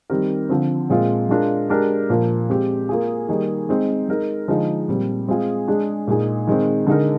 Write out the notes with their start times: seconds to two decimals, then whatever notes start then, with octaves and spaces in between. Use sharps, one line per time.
0.10 D#3 G3 C4 G4 A#4
0.49 D3 F3 C4
0.90 A#2 G#3 C4 F4
1.29 G#3 D4 F4 A#4
1.69 G#3 D4 G4 A#4
2.10 A#2 F3 A#3
2.49 G#3 C4 G4
2.89 A#3 F4 G#4
3.28 D#3 G3 A#3 D#4 G#4
3.69 G#3 C4 D#4
4.09 G#3 D#4 A#4
4.48 D3 F3 G#3 D#4 G#4
4.89 A#2 G3 C4
5.28 G#3 C4 F4 G#4
5.68 G#3 D4 G#4
6.08 A#2 G#3 D#4 G#4
6.47 D#3 G#3 C4
6.87 D3 G#3 D#4 A#4